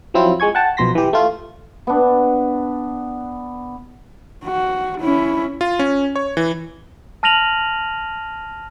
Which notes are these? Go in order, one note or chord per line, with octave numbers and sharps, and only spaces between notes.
F3 F#3 C4 E4 F4
G#3 G#5 C#6 G#6
F#5 G5 A5
B1 B2 F3 C6 A#6 B6
E3 G4
A3 F4
B3 D4
F#4
C#4 E4
F4
C#4
C#5
E3
A5 F6 A#6 D#7 F7 F#7